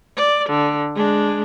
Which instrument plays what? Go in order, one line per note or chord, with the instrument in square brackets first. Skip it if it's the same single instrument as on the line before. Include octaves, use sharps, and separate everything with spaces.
[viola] D5
D3
G#3 D4